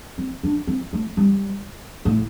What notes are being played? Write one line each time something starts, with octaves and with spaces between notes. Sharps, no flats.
C4
D4
C4
A3
G3
A2